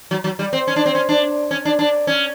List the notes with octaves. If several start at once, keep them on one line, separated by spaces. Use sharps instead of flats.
F#3
F#3
G3
C4
C#4
D4
C4
C#4
D4
C#4
D4
D4
C#4